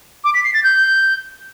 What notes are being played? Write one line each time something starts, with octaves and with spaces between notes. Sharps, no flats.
D6
B6
C7
A6
G6